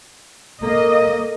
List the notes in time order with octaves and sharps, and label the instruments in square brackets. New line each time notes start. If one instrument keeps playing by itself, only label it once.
[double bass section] A#3 [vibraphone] A4 [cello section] D#5